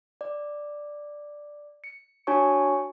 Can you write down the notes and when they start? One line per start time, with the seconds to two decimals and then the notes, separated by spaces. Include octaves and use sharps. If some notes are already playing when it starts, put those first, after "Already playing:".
0.21 D5
1.84 C#7
2.27 D4 F#4 C#5 G#5 A5 C#6